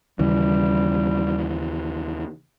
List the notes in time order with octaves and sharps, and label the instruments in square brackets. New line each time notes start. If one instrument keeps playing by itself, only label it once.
[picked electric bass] D#2 C#3 E3 [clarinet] G3